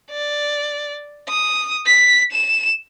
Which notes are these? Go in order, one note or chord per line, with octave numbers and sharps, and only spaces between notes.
D5
D#6
B6
E7